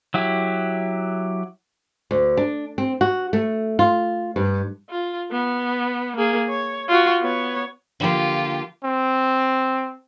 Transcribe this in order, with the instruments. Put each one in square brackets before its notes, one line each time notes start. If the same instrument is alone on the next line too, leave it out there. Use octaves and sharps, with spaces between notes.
[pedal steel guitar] F#3 E4 G4
[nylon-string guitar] D2
D4
C4
F#4
A3
F4
G2
[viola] F4
B3
A#3 G#4
C#5
F4 F#4
B3 C#5
[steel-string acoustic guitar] D3 F3 A#3 [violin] F4 G4
[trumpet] C4